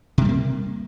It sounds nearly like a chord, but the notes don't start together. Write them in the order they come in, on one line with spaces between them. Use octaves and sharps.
C3 G3 B3 A#3